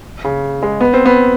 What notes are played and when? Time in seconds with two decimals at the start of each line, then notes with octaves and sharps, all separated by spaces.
0.24 C#3
0.63 G#3
0.81 B3
0.93 C4
1.06 B3